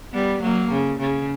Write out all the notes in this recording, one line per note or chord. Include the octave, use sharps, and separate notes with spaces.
G3 B3
F#3 A#3
C#3
C#3